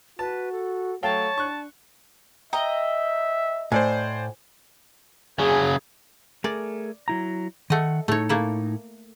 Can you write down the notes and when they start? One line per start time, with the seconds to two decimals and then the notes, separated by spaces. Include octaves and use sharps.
0.19 F#4 B4 A5
0.52 A4
1.03 F#3 A3 C#5 F5 G5 A5
1.38 D4 C#6 F#6
2.53 D#5 E5 G5 A#5
3.72 A2 C5 D5 G#5
5.39 C#3 F#3 G#4
6.44 A3 G#4 A#4 D5
7.08 F#3 E4 A#5
7.70 D#3 A3 D#5 F#5
8.08 A2 A3 D#4 C#5
8.29 A3 A#3 E4